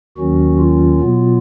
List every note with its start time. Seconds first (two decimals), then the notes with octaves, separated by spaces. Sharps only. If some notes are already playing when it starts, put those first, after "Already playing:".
0.17 D#2 D#3 F#3 C#4 F#4
0.59 F4
1.00 B2 F#3 B3